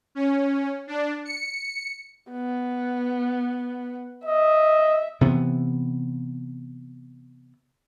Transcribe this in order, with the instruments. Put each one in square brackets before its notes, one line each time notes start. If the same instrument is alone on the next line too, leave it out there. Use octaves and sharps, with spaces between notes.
[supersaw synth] C#4
D4
C#7
[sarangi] B3
[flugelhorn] D#5 [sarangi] E5
[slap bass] C3 E3 B3